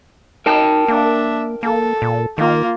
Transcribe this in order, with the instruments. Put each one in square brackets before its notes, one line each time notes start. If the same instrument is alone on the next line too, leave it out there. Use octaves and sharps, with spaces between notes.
[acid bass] D#4 [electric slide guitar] A#4 G5 A5
[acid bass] A#3 [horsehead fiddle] D4 E5
[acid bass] A#3 [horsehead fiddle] A4
[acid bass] A#2
[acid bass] D#3 [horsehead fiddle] A#3 F4